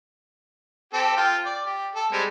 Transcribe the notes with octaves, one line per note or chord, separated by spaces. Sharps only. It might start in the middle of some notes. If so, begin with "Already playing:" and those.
C4 G4 A4
F4 G5
D5
G4
A4
G3 G#3 C4